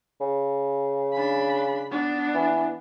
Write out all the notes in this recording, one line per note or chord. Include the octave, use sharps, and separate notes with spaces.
C#3
D4 B5
B3 D4
E3